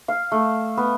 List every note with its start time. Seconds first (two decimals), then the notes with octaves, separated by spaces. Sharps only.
0.08 F5
0.32 A3
0.77 B3